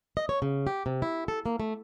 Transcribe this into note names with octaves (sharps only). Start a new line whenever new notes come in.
D#5
C#5
C#3
G4
C3
E4
A4
A#3
A3